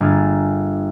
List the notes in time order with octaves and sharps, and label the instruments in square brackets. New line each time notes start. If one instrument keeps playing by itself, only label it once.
[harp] G1 A#3 G#4 F6 A6